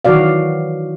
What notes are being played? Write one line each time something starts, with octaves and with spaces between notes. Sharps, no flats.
D#3 E3 F#3 F#4 D5 F5